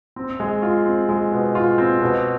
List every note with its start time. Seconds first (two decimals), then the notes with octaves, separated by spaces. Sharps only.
0.16 C4
0.40 G#3
0.62 F4
0.86 C4
1.09 G#3
1.32 B2
1.55 F4
1.78 C4
2.01 B2